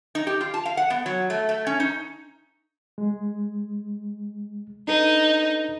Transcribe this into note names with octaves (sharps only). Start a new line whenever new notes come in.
D#4
G4
F4
A5
F5
F#5
B3
F#3
A3
A3
C#4
D#4
G#3
D4 D#4 A4 B4